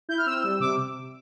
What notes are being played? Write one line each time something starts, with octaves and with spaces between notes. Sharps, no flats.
E4 G6
F6
C4 E6
G3
C3 D6